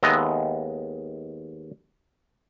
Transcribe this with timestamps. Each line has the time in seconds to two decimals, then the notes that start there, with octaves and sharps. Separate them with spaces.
0.03 D#2 G#3 B3 D#5 E5 A#5